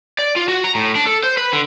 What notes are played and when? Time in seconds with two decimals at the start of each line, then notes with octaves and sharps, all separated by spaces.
0.19 D5
0.36 F4
0.48 F#4
0.64 A#5
0.75 A2
0.95 D4
1.07 A4
1.23 C5
1.37 B4
1.53 D3